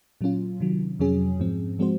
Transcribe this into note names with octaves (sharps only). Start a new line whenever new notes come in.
A#2 F#3 C#4 F4
C3 D#3 F#3
F2 C3 F#3 C#4 G#4
G#2 F3 C4
F3 G#3 C4 F#4 C5